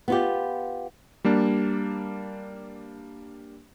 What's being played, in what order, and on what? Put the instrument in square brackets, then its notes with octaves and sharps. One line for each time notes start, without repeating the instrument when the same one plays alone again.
[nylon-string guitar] B3 F4 G4
[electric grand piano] G3 A#3 D4